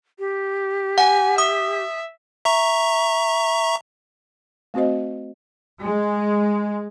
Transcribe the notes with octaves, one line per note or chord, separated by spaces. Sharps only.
G4
F#5 G#5
E5 D#6
E5 A#5 C#6
A3 C4 F#4 C5 D#5
G#3